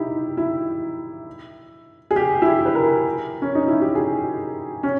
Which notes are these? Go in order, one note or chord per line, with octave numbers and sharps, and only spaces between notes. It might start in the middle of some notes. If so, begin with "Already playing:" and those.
Already playing: D#4 E4 G4
E4
G#4
G4
E4
G4
B4
A#4
C#4
D#4
E4
G4
G#4
C#4